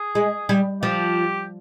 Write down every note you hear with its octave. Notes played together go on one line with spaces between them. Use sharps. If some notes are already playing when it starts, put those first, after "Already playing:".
Already playing: G#4
G#3
G3
F3 G4